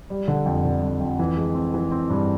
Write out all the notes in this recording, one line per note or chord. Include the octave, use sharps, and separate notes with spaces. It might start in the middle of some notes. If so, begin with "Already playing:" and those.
G3
D3
F2
D3
F2
F2
E3
G#3
C4
E3
C4
G2